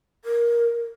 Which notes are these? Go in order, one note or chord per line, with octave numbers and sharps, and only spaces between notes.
A#4